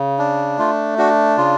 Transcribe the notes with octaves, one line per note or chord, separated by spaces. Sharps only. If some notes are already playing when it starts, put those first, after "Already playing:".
Already playing: C#3
D4
A3 F4
D4 F#4
C#3 F4